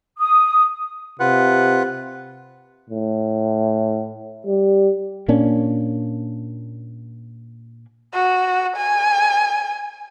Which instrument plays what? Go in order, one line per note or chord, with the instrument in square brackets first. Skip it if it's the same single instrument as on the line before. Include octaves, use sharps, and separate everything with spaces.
[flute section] D#6
[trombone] C3 [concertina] F4 B4 F#5
[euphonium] A2
G3
[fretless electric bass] A#2 A#3 C#4 D4
[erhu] F#4
G#5